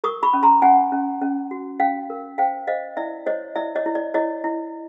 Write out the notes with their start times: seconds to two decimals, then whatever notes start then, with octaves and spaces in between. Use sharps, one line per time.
0.04 A#4 C#6 D#6
0.23 B5 C#6
0.33 C#4
0.43 A#5 C6
0.62 C#4 F#5 G#5
0.92 C#4
1.22 C#4
1.51 F#4
1.80 C#4 F5 G5
2.10 A#4
2.38 C5 F5 G5
2.67 C5 D#5 F5
2.97 E4 D5 E5
3.26 C5 C#5 D#5
3.55 E4 D5 E5
3.76 C#5 D#5
3.86 E4
3.95 D5
4.14 E4 C#5 D#5
4.44 E4